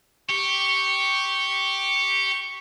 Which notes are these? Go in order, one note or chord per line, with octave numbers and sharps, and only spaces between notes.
G4 C#6